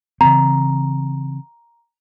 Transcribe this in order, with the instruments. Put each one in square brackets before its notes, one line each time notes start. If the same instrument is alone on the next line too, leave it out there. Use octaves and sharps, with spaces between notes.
[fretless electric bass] C#3 E3 C4 [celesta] A#5